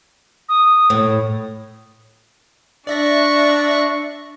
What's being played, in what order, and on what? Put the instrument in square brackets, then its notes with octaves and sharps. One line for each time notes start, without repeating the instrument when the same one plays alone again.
[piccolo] D#6
[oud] A2
[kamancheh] D4 [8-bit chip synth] D5 E5 A#6 [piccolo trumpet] C#6